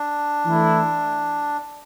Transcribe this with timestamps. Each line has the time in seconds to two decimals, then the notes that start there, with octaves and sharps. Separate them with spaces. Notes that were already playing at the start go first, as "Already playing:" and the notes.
Already playing: D4
0.46 E3 A3 E4